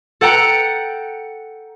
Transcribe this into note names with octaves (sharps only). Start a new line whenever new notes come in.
A4 F#5 G5 A#5 F#6